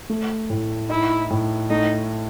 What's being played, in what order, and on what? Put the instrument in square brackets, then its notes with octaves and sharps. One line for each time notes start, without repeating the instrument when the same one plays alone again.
[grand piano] A3
A2
[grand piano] D#4 [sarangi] E4
[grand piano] A2
[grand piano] A3 [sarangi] D#4